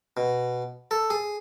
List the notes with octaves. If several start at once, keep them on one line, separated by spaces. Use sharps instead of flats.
B2
A4
G#4